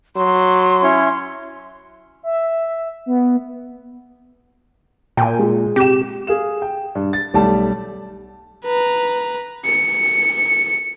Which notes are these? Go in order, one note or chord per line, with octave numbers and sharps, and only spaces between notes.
F#3 C6
C#4 E4 C#5
E5
B3
A#2 G5 G#5
G#3
C3 G4 E7
G#4 F5 E7
G5
G2
A6
B1 G3 A3 A5
B4 A#5
C#7